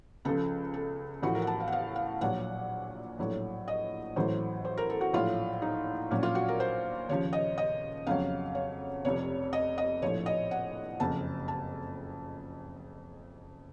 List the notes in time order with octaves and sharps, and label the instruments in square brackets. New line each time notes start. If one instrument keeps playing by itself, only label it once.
[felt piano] C#2 C#3 F3 A4
A4
A1 A2 F3 F#4
A#4
F#5
A5
F5
F#5
F5
F5
A#1 A#2 F#3 F#5
A#1 A2 F#3
D#5
A1 A2 F#3 C5
C5
A#4
A4
F#4
A#1 A2 F#3 F4
D#4
A#1 A#2 F#3 C#4
F4
F#4
A#4
C5
D#2 C#3 F3 C#5
D#5
D#5
F2 C#3 F#3 F5
C#5
F1 F2 C3 C#5
D#5
D#5
A#1 A2 F3 C#5
D#5
F#5
F#1 F2 C#3 A5
A5